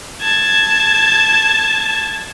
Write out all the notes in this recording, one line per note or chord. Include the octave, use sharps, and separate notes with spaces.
A5 G#6